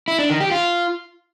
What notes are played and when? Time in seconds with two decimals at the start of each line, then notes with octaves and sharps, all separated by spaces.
0.08 E4
0.19 D4
0.30 D#3
0.40 G4
0.51 F4